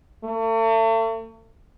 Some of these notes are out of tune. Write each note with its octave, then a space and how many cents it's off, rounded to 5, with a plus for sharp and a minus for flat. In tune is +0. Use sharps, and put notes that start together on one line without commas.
A3 +40